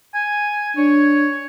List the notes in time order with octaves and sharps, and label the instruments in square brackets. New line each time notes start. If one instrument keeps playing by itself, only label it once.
[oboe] G#5
[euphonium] D4 [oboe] C#5